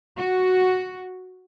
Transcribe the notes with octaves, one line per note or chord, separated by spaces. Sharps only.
F#4